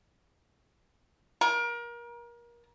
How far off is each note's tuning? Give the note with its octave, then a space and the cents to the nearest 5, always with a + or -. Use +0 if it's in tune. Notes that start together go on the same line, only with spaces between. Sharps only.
A#4 +30